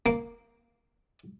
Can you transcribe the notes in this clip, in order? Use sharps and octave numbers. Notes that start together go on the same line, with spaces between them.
A#3